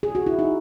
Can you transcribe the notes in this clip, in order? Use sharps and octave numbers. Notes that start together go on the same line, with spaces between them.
G#4
F#4
E4
D#4